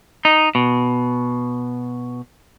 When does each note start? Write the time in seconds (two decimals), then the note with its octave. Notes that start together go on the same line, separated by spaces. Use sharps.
0.25 D#4
0.55 B2